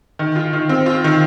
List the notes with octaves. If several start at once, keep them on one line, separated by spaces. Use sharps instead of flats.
D#3
F4
D#3
C4
F4
D#3